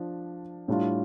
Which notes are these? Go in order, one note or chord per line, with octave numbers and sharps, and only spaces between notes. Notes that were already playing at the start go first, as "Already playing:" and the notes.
Already playing: F3 D4
A2 G3 D4 F4